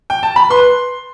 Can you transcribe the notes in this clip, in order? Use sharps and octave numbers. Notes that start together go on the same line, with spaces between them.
G5
A5
B5
B4 C6